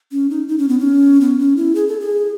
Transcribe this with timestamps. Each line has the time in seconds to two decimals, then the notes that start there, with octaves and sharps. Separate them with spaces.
0.12 C#4
0.30 D#4
0.48 D#4
0.58 C#4
0.69 B3
0.79 C#4
1.21 B3
1.39 C#4
1.57 E4
1.75 G#4
1.88 A4
2.00 G#4